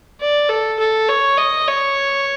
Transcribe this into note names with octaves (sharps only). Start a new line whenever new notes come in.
D5
A4
A4
C#5
D#5
C#5